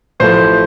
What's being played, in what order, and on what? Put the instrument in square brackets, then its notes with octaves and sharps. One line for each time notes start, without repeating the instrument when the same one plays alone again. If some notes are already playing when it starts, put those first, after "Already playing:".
[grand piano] A1 A2 F3 A3 C5